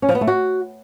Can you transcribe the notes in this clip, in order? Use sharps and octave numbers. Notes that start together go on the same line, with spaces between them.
C#4
F3
B3
A3
F#4